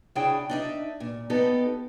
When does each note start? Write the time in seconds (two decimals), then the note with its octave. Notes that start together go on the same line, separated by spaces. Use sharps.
0.15 C#3 D4 E4 G#4 C#5 G5
0.49 D4 D#4 E5
1.00 A#2
1.30 B3 D#4 G4 A4